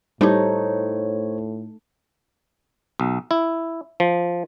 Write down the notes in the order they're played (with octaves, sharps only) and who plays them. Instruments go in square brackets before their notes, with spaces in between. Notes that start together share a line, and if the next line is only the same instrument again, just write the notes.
[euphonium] A2 [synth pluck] G3 E4 G4 [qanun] A3 D#4 [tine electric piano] C5 C#5
[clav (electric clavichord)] B1
E4
F3